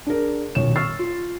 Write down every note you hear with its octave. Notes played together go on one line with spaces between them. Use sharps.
D4 G#4 A#4
D#1 B1 C#5 E7
C#6 E6 F6 A6 C7
F4